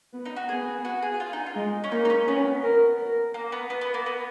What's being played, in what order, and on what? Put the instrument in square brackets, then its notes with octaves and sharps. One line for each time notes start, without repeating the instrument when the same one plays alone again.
[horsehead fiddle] B3
[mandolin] D#4
F#4
[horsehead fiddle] B3 [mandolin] G#4
[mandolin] F#4
G#4
F4
D#4
F4
[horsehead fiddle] G#3
[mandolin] C#4
[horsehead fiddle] A#3 [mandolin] D#4
[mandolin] D#4
C#4
[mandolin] B3 [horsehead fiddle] C#4
[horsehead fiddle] A#4
A#4
[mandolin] A#3
B3
[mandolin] B3 [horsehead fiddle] B4
[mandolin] B3
A#3
B3